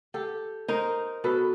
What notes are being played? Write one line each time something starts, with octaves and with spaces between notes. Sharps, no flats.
G4 A4
D#4 A#4 C5
B2 A4 B4